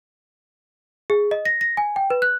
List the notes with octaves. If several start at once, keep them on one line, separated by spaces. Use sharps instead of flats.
G#4
D#5
A#6
A#6
G#5
G5
B4
F#6